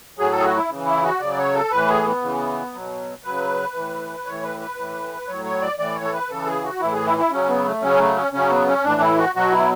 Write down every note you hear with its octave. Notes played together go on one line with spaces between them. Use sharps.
A2 F#3 G#4
A4
G#4
F#4
E4
C#3 E3
E4
F#4
C#3 F#3 D5
C#5
A4
A2 E3 B4
G#4
B3
C#3 E3
B2 F#3
C#3 F#3 B4
A2 E3
A2 E3 C#5
B4
B4
A2 E3
A2 F#3 C#5
C#5
D5
A2 E3 D5
C#5
A4
B4
C#3 E3 A4
G#4
F#4
A2 E3 E4
G#4
E4
E4
C#3 F#3 C#4
B3
A3
C#3 F#3 C#4
A3
C#4
C#3 F#3 C#4
B3
C#4
A2 E3 D4
E4
F#4
B2 F#3 F#4
E4